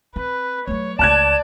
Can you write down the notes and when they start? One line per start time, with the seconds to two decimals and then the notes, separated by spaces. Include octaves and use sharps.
0.16 C4 B4
0.67 F#3 A3 C#5
0.99 C#2 A3 D5 A5 F#6 G#6 E7